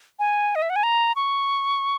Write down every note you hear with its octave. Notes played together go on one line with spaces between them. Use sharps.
G#5
D#5
E5
F#5
G#5
A#5
C#6